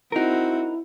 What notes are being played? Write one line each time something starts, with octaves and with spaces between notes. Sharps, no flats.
C4 D#4 E4 F#4 A#4